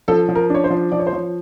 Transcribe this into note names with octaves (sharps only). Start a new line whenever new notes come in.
F3 A4
F3
A#4
D4 C#5
C5
F3
F3 D5
C#5
C5
F3 C#5